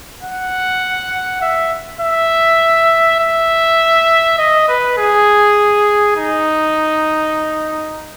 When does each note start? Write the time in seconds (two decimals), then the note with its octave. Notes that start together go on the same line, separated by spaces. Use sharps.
0.22 F#5
1.42 E5
2.00 E5
3.19 E5
4.38 D#5
4.69 B4
4.98 G#4
6.16 D#4